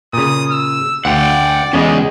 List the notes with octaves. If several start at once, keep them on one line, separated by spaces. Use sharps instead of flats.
A#2 C#3 D#6
E6
D2 D5 F#5 G5
E2 G#3 C#4 G#4 D#5 G#5